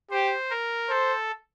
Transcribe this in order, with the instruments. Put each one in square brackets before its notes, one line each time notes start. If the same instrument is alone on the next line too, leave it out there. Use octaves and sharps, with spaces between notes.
[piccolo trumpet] G4 [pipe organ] C5
[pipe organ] A#4
[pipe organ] A4 [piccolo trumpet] C5